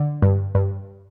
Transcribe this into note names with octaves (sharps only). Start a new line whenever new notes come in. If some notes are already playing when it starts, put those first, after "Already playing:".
Already playing: D3
G2
G2